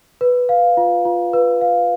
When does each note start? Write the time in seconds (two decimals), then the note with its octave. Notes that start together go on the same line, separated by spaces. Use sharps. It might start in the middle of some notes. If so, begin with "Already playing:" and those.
0.21 B4
0.49 F5
0.77 F4
1.05 F4
1.33 B4
1.61 F5